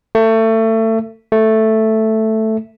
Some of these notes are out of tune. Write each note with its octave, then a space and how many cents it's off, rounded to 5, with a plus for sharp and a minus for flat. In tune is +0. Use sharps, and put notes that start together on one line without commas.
A3 +25
A3 +0